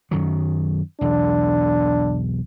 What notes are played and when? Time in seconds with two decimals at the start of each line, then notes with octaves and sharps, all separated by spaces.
0.11 F#2 D#3 F#3
1.01 B1 E2 D4